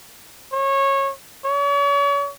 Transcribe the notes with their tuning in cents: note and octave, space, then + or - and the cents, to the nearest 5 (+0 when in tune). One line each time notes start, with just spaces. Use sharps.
C#5 -20
C#5 +40